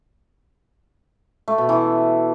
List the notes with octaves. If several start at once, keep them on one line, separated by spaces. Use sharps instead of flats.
A3
B2
E3